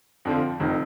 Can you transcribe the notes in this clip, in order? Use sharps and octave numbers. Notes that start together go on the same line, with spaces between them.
F2 D3 F3
F1 D#3